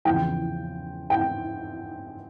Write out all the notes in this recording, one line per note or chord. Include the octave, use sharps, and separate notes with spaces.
E2 C#3 F3 G5
G5